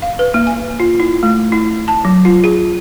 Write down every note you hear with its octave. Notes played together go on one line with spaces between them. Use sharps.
F5
B4
A#3
G#5
F4
E4
A3
E4
A5
F#3
F4
G#4